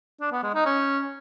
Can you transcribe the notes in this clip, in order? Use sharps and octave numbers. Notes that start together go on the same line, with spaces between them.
D4
B3
G#3
D#4
C#4